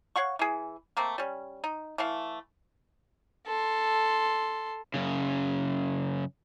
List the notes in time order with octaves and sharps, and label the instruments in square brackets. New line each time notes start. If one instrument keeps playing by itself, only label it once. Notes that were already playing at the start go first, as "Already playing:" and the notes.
[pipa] C#5 F5 F#5 C#6
E3 G#4
A3 A#3 C4
G3 C#4
D#4
E3 A3 F5
[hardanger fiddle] A4 C6
[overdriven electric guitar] F#2 C#3